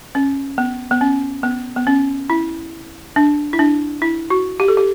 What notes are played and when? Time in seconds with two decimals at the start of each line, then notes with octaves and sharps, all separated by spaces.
0.15 C#4
0.58 B3
0.91 B3
1.01 C#4
1.43 B3
1.76 B3
1.87 C#4
2.30 E4
3.16 D4
3.53 E4
3.59 D4
4.02 E4
4.30 F#4
4.60 G4
4.68 A4
4.77 G4